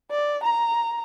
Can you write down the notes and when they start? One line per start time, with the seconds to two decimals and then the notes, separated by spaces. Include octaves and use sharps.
0.10 D5
0.43 A#5